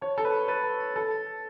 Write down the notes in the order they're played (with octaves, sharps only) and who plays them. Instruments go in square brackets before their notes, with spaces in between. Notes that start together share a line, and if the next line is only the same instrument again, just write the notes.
[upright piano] C#5 [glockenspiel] A5
[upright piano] A4 [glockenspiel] A5
[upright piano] B4
[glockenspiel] A5
[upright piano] B4 [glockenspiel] A6
[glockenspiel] A5
A6
[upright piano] A4 [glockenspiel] A6
[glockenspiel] A6
A6